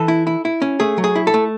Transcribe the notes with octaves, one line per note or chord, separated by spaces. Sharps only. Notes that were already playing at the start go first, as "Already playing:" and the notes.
Already playing: E3 A4
E4
E4
E4
C#4
A3 G#4
F#3
G#4
E4
A4
A3